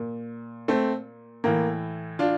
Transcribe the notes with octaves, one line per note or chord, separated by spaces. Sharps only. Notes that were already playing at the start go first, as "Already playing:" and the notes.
Already playing: A#2
A3 C4
A2 E3 A#3
D4 F4